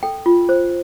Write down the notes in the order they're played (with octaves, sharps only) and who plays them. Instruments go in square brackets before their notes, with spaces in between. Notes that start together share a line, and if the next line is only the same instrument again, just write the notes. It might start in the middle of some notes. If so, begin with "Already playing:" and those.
[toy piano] A4 G5
F4
C5